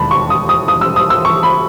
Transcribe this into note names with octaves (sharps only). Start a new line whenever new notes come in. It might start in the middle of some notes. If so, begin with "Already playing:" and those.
Already playing: E1 D#2 A5 B5
C#6
D#6
D#6
D#6
E6
D#6
E6
C#6
B5